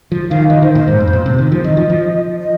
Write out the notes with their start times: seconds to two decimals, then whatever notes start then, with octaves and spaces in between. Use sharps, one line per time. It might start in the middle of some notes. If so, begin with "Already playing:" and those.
0.12 F3
0.30 D#3 F5
0.49 D#3 D#5
0.62 D#3 C5
0.74 A#2 C5
0.88 G#2
1.00 F2
1.08 G#2
1.13 A#2
1.26 C3
1.38 D#3
1.52 F3
1.64 D#3 D#5
1.77 F3
1.90 F3
2.41 D#5